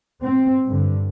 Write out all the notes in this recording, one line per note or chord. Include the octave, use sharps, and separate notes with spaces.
C4
G2 D3